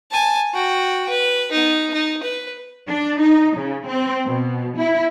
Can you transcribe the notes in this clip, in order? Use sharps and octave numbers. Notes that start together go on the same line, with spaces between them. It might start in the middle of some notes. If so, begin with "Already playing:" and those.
G#5 A5
F#4 G5
B4
B3 D#4
D#4
B4
D4
D#4
C#3
C4
B2
E4